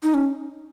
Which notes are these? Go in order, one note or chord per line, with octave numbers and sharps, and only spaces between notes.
D#4
C#4